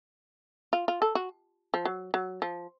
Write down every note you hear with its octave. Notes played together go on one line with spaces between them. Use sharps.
F4
F4
A4
F#4
F3
F#3
F#3
F3